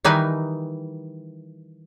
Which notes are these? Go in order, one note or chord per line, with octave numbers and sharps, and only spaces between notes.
D#3 E3 G3 D#4 B4 G#5